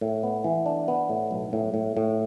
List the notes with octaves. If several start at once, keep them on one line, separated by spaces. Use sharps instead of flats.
A2
B3
E3
D4
B3
A2
B1
A2
A2
A2